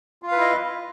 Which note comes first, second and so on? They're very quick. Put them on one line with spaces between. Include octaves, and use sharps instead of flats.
F4 F5 B4 E4 D#5